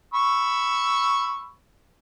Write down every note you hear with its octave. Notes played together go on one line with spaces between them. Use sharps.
B5 C#6 E6